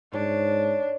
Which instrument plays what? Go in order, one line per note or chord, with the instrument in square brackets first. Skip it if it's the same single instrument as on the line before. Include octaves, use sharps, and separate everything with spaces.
[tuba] G#2 [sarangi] D4 [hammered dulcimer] C#5